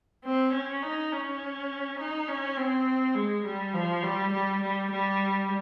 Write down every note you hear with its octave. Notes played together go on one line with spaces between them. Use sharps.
C4
C#4
D#4
C#4
D#4
C#4
C4
G#3
G3
F3
G3
G3
G3
G3